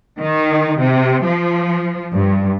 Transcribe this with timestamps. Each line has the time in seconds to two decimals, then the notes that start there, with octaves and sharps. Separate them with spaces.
0.20 D#3
0.80 C3
1.25 F3
2.12 G2